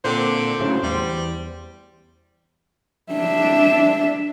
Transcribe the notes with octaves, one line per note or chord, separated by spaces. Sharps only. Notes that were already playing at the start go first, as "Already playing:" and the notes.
A#2 D3 C4 C5 D6
A2 C#3 F#3
E2 G3
D4 E5